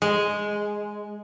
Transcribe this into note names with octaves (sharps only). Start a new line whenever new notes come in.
G#3